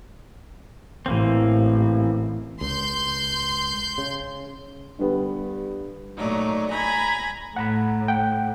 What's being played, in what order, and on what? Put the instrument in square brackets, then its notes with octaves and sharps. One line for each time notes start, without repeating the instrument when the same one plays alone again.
[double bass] A1 [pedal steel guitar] E3 A#3 C4
[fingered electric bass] C#2 [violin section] C6 G6
[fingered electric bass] C#3
[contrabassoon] G2 [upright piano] D3 G3 B3
[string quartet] A#2 F#3 A3 D#4 D5
G#5 A#5 B5 G#6
[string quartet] A2 [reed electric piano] F#5 A#5 B5
[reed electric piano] F#5 G5